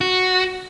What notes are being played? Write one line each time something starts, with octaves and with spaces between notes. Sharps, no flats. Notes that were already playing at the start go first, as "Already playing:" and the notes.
F#4